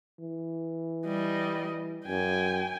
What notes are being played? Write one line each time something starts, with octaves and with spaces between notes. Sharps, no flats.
E3
G3 D#5
F#2 G5 G#5